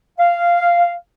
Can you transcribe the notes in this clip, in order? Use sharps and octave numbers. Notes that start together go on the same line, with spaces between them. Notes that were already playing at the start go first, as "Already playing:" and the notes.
F5